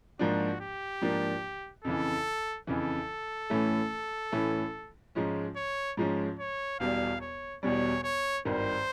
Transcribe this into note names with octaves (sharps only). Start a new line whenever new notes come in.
G#2 F3 A#3 D4 F#4
G4
G#2 F3 A#3 D4
F2 C#3 E3 A4
F2 C#3 E3 A4
A2 E3 A3 C#4
A2 E3 A3 C#4
G#2 F3 G#3 C#4
C#5
G#2 F3 G#3 C#4
C#5
E1 E2 B2 G3 F5
C#5
E1 E2 B2 G3 C#5
C#5
G#1 G2 D#3 C5